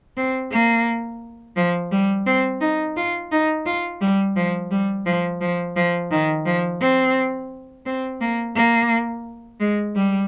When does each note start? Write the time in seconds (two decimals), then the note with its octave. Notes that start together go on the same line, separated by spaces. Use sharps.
0.17 C4
0.51 A#3
1.56 F3
1.92 G3
2.26 C4
2.61 D#4
2.97 F4
3.32 D#4
3.66 F4
4.01 G3
4.36 F3
4.71 G3
5.06 F3
5.41 F3
5.76 F3
6.11 D#3
6.46 F3
6.81 C4
7.86 C4
8.21 A#3
8.56 A#3
9.60 G#3
9.95 G3